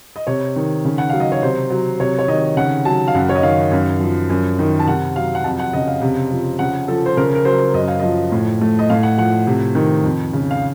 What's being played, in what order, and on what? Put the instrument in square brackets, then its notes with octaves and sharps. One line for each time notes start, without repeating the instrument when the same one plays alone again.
[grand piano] D#5
C3 C#5
D#3
C#3
F#5
F#3 F5
D#5
C#5
C3 C5
F#3
C3 C#5
C#5
D#3 D#5
C#3 F#5
F#3 A5
F5
F#2 F#5
C#5
D#5
D#3 F5
F#2
F3
F#2
D#3
A5
C3 F#5
F#3 F5
F#5
F2 A5
F#5
C#3 D#5
F5
C3
F3
C#3 F#5
F3 A4
C5
C#3 A#4
A#4
F#3 C5
F#2 D#5
F5
F3 D#5
A2
A3
D#5
A2 F5
F#5
F3 F#5
C3
D#3
F2
C#3
F5